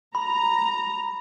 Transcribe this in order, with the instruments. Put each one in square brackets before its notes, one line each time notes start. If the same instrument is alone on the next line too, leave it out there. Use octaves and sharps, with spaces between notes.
[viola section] A#5 [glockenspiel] B5